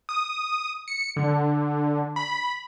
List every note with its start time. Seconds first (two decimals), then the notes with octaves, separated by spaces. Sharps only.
0.09 D#6
0.88 C#7
1.16 D3
2.16 B5